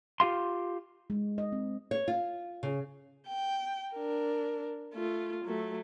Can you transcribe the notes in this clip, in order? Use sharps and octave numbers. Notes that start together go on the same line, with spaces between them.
F4 G4 F5 C6
G#3
D#5
C4
C#5
F4
C#3
G5
D4 A#4
A3 F4
F#3 A3